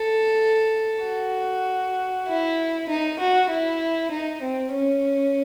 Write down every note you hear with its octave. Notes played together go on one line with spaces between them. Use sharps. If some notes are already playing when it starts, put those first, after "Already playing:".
Already playing: A4
F#4
E4
D#4
F#4
E4
D#4
C4
C#4